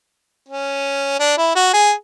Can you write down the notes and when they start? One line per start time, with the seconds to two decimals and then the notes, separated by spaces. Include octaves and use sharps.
0.49 C#4
1.20 D4
1.38 E4
1.56 F#4
1.73 G#4